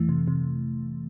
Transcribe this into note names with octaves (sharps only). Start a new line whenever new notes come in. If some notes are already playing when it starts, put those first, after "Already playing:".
Already playing: F2 E3 A3
C3
C3